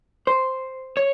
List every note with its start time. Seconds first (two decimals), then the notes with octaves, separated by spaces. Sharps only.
0.27 C5
0.97 C#5